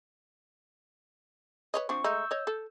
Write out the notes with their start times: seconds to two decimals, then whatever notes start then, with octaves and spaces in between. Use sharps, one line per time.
1.74 B4 C#5 D#5
1.89 F3 C4 D4 C#6
2.04 G#3 A3 D#4 E6 G6
2.31 C#5 D#5
2.47 A4